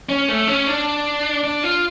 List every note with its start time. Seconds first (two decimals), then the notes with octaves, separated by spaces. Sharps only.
0.09 C#4
0.28 A3
0.48 C#4
0.67 D4
1.44 D4
1.64 F4